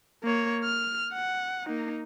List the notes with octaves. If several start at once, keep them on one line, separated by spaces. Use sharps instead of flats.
A#3 C#5
F6
F#5
A#3 D#4